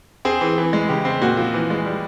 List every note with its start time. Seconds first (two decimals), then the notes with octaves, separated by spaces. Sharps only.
0.25 C4 G#4
0.41 E3
0.58 E3
0.73 G#3
0.89 C#3 G4
1.05 C4
1.21 A#2 F#4
1.37 F3
1.54 E3
1.70 G#3
1.85 G3